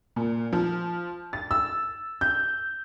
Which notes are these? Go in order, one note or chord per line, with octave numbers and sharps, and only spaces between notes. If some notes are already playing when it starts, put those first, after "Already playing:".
A#2
F3
A6
E6
G6